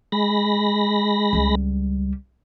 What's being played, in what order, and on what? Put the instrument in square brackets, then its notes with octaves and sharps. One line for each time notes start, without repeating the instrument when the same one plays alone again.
[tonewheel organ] G#3 B5 A#6
[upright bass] C#2 G3